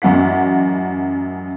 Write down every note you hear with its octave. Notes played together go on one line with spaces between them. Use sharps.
A1 F#2 F#5 B6